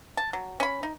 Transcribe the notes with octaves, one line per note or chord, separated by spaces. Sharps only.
A5
F#3
C#4 B5
D#4